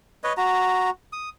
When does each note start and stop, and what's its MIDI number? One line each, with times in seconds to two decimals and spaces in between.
0.24 0.33 71
0.24 0.33 73
0.24 0.33 75
0.37 0.90 66
0.37 0.90 82
1.13 1.29 87